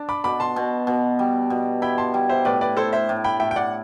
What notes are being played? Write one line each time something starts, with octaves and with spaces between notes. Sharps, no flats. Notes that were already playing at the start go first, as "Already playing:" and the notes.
Already playing: D4
B5 D6
B2 B5 D6
A5 C6
B2
B2
G3
B2
E4 G5 B5
A5 C6
G3
C5 E5
A2 B4 D5
B4 D5
E4 A4 C5
C5 E5
A2
G5 B5
A2 E5 G5
G5
D5 F#5